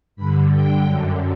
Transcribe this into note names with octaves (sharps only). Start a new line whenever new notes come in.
G2 D3 B5
G5
F#2 D3